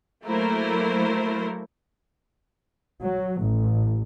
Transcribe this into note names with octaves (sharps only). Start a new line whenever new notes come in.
F#3 A3 A#3 E4 A#4 C5
F#3
A1